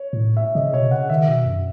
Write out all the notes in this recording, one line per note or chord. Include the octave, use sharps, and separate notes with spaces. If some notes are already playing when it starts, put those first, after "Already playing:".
Already playing: C#5
A2
E5
C#3 D#5
B2 C#5
C#3 F#5
D#3 E5
B2
F#2